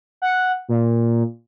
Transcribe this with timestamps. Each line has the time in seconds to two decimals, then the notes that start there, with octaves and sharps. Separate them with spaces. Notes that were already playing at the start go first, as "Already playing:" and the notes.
0.22 F#5
0.69 A#2